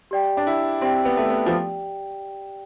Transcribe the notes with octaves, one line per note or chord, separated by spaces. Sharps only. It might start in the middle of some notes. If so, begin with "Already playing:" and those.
G4 D5 G5
D4
E4
C4 G4 D5 G5
B3
A3
B3
F3